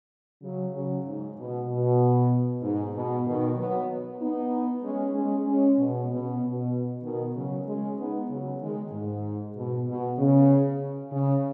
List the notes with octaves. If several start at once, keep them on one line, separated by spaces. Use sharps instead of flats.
C#3 F#3
C#3 F#3
G#2
B2
B2
G#2
B2
B2 D#3
F#3 B3
B3 D#4
G#3 C#4
G#3 C#4
G#3 C#4
B2
B2
B2
B2 D#3
C#3 F#3
G#3 C#4
B3 D#4
C#3 F#3
D#3 G#3
G#2
B2
B2
C#3
C#3